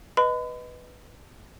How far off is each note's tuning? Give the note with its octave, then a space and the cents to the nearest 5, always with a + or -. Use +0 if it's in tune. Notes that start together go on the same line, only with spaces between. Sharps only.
B4 +0 D#5 +0 B5 +40